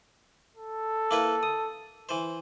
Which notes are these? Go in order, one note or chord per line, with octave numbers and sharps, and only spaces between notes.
A4
A#3 E4 B4
D#6
E3 C5